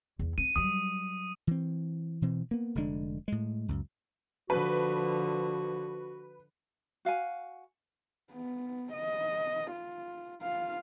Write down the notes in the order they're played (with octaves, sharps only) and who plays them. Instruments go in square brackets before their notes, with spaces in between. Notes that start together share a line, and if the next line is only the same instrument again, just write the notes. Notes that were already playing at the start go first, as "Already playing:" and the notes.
[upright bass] E2
[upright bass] C4 [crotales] D#7
[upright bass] F#3 G3 [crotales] D#6
[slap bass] E3 C4
B2 E3 C4
A#3 B3
F1 D3 G#3 D4
A2 G#3
C#2 F#2
[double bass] D3 F3 [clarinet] F#4 [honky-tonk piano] B4
[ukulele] F#4 F5 F#5 G#5
[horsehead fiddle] B3
D#5
F4
F4 F5